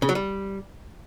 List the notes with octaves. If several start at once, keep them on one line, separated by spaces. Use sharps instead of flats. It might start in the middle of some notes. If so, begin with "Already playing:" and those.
C#3
F#3
G3